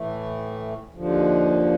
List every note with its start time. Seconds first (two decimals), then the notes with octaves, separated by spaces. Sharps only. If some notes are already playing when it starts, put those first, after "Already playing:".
Already playing: A2 E3 A3
0.94 D#2 D3 F3